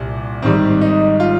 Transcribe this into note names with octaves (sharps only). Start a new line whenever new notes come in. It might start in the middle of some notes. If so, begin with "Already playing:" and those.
Already playing: C2 A#2
G#1 G#2 D#3 G3 C4
D#4
F4